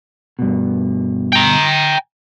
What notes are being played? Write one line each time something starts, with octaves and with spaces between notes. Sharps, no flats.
G2 B2
G5 A#5